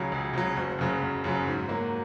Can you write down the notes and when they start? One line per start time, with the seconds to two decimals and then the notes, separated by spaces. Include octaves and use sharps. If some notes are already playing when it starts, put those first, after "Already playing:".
Already playing: C#2 C#3 F#3
0.12 C#2
0.34 C#3 F#3
0.57 F#1
0.79 F#2 C#3 F#3
1.02 F#1
1.24 F#2 C#3 F#3
1.47 G#2
1.69 F#3 A#3